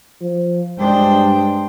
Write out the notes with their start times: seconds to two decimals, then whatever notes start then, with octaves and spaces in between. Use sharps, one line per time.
0.22 F3
0.78 G2 G#3 D4 C5 G5